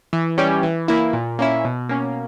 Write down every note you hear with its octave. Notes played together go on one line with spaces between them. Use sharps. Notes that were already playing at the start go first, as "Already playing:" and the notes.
E3
G3 C#4 G4
E3
A#3 E4
A#2
A#3 C#4 E4
B2
A#3 C#4